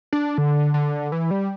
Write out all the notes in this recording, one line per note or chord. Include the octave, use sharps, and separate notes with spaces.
D4
D3
D3
E3
G3